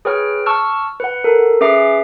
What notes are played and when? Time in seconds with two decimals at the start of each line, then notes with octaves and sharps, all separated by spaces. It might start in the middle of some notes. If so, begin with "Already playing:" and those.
0.05 G#4 B4 C#5 G5 F6
0.46 A5 C#6 E6 F6
1.00 B4 F#5
1.24 A4 A#4
1.61 C#4 G#4 B4 E5 D6 C7